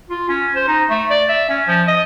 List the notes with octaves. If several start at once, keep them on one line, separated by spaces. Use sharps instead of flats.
F4
C#4
C5
D#4
A3
D5
E5
C#4
F3
D#5